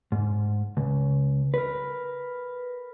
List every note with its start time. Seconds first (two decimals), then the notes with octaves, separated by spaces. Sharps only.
0.12 G#2
0.77 C#2
1.54 A#4 B4